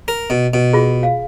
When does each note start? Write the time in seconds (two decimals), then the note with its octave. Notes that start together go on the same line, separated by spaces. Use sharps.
0.08 A#4
0.30 B2
0.54 B2
0.73 F4 G#4
1.03 F5